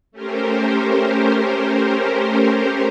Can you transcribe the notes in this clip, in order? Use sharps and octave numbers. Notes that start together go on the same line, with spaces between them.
A3 C#4 G4 A#4 C5